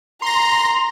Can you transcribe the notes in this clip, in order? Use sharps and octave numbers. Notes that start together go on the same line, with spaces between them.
A#5 C6 A#6